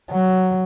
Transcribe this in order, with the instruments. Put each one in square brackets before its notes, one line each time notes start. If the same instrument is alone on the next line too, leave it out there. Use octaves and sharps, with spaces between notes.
[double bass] F#3